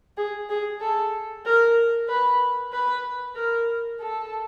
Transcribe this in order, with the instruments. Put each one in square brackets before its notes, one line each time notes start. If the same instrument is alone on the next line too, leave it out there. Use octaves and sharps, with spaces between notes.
[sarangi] G#4
G#4
A4
A#4
B4
B4
A#4
A4